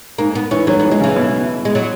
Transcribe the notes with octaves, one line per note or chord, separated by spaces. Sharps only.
G#2 A#3
B3
E3 C#4
F#3 C#4
B3
E3
G#3
C#3 E3
B2
G#3
F#3